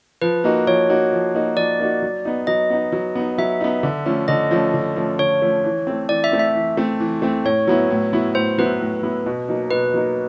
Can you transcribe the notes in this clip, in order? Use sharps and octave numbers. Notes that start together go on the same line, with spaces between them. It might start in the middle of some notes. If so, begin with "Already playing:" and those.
F3 B4
A#3 D#4 F#4
F3 C#5
A#3 D#4 F#4
F3
A#3 D#4 F#4
F3 D5
A#3 D#4 F#4
F#3
B3 D#4
F#3 D#5
B3 D#4
F#3
B3 D#4
F#3 E5
B3 D#4
D3
F3 A3 C#4
D3 D#5
F3 A3 C#4
D3
F3 A3 C#4
D3 C#5
F3 A3 C#4
E3
A3 C4
E3 D5
E5
A3 C4
E5
E3
A3 C4
E3
A3 C4
A2 C#5
F#3 B3 E4
A2
F#3 B3 E4
A2 C5
F#3 B3 E4 B4
A2
F#3 B3 E4
B2
F#3 A#3 D#4
B2 B4
F#3 A#3 D#4